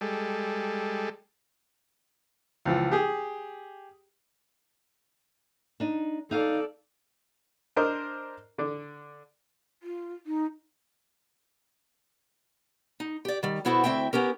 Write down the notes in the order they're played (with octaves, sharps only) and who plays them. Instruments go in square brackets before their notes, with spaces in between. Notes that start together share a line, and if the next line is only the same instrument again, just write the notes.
[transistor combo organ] G3 G#3 A4
[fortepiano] C#2 E3 F3
G4 G#4
[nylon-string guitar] D4 D#4
[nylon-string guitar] D#4 F5 [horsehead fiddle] A4 D5
[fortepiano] D4 A#4 C5 D#5
D3 D4
[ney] F4
D#4
[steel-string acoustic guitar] D#4
G4 D5
D#3 G3
B2 B3 E4 F#4 A4 C5
D2 C4 E4 E5 G5
B3 C#4 G4 A#4